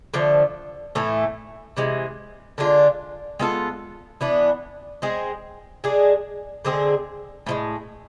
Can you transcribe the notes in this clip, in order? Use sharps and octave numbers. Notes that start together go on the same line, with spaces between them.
D3 F3 A3
A2 E3 A3
C3 E3 G#3
D3 G#3 D4 F4
G#3 B3 F4 A4
E3 B3 D4
G#3 C4 G#4
G#3 D4 G#4
D3 G#3 C4 G#4
A2 F3 G#3